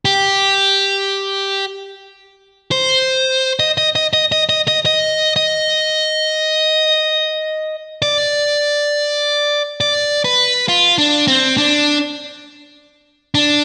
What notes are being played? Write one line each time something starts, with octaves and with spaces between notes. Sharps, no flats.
G4
C5
D#5
D#5
D#5
D#5
D#5
D#5
D#5
D#5
D#5
D5
D5
B4
F4
D4
C4
D4
D4